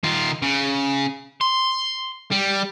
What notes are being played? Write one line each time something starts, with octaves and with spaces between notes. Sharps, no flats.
D#3 F4
C#3
C6
G3